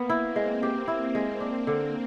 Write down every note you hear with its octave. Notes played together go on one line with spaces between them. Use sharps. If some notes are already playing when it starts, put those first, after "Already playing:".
Already playing: A#3 B3
E4
C4
G#3
G4
E4
G#3
D4
D3